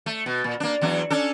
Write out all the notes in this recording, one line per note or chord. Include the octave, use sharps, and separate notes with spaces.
A3
B2
A#2
A#3 D4
E2 F#3 D4
C#4 D4 A4